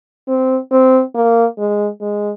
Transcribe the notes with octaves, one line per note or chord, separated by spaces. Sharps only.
C4
C4
A#3
G#3
G#3